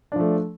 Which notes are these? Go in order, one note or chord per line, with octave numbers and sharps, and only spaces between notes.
F3 A3 D4